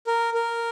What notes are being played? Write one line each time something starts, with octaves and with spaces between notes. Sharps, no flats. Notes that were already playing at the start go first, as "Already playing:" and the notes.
A#4
A#4